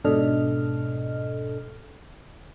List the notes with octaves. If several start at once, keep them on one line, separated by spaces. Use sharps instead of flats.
G#2 B2 D4 A4 D#5 F6